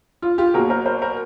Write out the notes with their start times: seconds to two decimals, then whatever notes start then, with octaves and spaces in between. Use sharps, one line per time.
0.22 F4
0.38 F4 G4
0.54 B2 F#3 A#3 G#4 A#4
0.70 A#4 C5
0.86 A#4 C5
1.02 A#4 C5